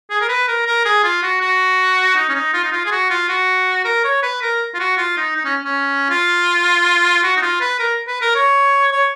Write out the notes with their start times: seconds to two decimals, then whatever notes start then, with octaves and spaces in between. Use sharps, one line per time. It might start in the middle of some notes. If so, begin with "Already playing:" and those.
0.10 G#4
0.21 A#4
0.29 B4
0.48 A#4
0.66 A#4
0.85 G#4
1.04 F4
1.23 F#4
1.41 F#4
2.16 D#4
2.29 C#4
2.35 D#4
2.54 F4
2.64 D#4
2.72 F4
2.85 G#4
2.92 F#4
3.10 F4
3.29 F#4
3.85 A#4
4.04 C#5
4.23 B4
4.42 A#4
4.74 F4
4.80 F#4
4.97 F4
5.17 D#4
5.36 D#4
5.45 C#4
5.65 C#4
6.10 F4
7.23 F#4
7.37 D#4
7.42 F4
7.61 B4
7.79 A#4
8.07 B4
8.21 A#4
8.35 C#5
8.92 C#5